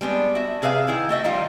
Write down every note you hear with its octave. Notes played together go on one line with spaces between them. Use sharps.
G3 G#3 B3 D4
F#4 E5
C3 G#4 B4 E5 F5
D#3 E4 G#4
A3 F#4 D#5 E5
D#3 F3 G3 F4